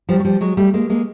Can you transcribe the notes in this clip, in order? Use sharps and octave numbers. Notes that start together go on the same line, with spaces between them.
F3 G3
F#3
F3 G3
F#3 G#3
G3 A3
G#3 A#3
G#3 A#3